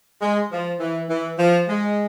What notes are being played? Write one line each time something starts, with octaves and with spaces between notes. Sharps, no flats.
G#3
F3
E3
E3
F3
G#3